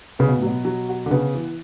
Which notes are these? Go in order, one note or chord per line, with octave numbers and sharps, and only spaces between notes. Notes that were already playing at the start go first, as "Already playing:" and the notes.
C#3 B3
B2
A2
B2 F#3
F#3
F#4
D3
C#3 B3
E3